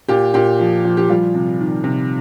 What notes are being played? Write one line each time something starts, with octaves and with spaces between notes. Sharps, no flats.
A#2 G4
A#2 G4
F3
F3
G4
G3 F4
C3
D#3
C3